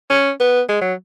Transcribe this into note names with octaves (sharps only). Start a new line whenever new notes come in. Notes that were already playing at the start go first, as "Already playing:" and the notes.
C#4
B3
G#3
F#3